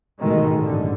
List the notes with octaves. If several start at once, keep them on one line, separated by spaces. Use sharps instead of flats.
A1 G#2 B2 D#3 G#3 A3
A1 G2 D3